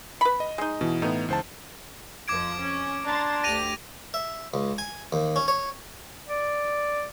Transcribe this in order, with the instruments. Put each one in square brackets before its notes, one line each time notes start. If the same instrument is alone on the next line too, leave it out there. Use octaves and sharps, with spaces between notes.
[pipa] B4 B5
[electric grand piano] D#5
[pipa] G#3 D#4
[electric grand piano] B2 [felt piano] E3
[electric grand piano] A2 B3 [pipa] D#4
[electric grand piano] C#2 C5 A5
[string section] F2 F3 [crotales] D6 G#6 D7
[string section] C#4
[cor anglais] D4 [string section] A#5 C6 A6
[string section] D2 G4 [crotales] A#6 D#7 F7
[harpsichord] E5
C#2
G#5
D#2
C#4
C#5
[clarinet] D5